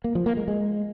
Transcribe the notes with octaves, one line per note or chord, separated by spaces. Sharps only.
A#3
F3
A#3
G#3
G#3